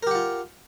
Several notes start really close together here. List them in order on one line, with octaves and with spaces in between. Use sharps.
A#4 G4 F#5 F4